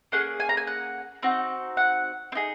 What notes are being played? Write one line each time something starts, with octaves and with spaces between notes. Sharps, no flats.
A#3 C#4 G#4 F#5
G#5
A#5
G#5
F#5
C4 D#4 F#4
F#5
C4
D#4 G#4